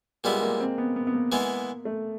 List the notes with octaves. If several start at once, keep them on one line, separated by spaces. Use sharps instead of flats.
A#2 G3 G#3 B3 E4
A#3
C4
B3
B3
B3
A#3
E3 G#3 B3
A3